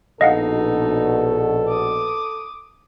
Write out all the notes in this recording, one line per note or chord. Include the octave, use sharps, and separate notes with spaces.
A#1 B2 D#4 A4 D#5 F5 F#5
D6 D#6